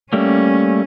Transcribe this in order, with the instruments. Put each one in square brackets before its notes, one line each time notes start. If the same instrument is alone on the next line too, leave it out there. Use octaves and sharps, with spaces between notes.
[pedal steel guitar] G3 A3 A#3 [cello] C#4